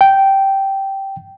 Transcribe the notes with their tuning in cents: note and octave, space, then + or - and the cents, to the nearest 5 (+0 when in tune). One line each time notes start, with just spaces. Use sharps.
G5 -10